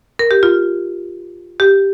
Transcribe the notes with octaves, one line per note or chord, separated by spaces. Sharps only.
A#4
G4
F4
G4